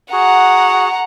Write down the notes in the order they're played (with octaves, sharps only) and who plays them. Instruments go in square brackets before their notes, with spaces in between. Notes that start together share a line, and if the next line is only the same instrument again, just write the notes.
[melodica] F#4 G#4 [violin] F#5 A#5